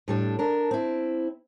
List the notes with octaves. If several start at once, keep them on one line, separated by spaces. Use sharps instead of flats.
A2 G3 D4
D4 A#4
C4 E4